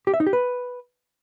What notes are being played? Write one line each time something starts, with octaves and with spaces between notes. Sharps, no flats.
G4
E5
D#4
G4
B4